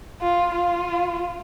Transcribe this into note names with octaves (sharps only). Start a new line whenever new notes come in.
F4
F4